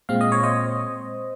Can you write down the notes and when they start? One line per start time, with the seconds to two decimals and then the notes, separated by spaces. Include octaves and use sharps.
0.09 A#2 G#3 C4 F5
0.21 D#5
0.32 C#5
0.43 C5 D#5